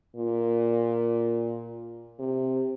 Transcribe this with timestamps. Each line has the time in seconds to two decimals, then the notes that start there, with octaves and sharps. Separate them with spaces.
0.16 A#2
2.19 C3